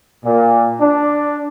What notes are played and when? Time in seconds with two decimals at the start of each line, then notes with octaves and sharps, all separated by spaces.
0.24 A#2
0.81 D4